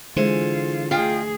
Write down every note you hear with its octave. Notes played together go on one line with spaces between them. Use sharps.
D3 E3 G#3 F4 C5
D2 F4 G#4 D#5 G5